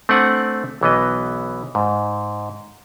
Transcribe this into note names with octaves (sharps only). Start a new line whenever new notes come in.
A3 C4 D4 D5 F#5 G#5
B1 E3 B3 D#5
G#2